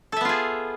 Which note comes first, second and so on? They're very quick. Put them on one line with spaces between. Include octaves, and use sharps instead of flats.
A4 E5 B3 F4 G#4